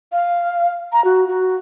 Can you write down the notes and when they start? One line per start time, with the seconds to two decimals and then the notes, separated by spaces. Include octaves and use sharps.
0.12 F5
0.92 A#5
1.04 F#4
1.27 F#4